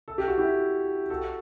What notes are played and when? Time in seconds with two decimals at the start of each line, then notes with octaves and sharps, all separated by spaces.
0.08 A4
0.18 G4
0.28 F#4
0.38 E4 G4
1.10 F#4 A4